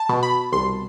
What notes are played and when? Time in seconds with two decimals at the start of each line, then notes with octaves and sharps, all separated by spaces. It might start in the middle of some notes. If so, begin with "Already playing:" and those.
Already playing: A5
0.09 B2
0.23 B5
0.52 C2 C6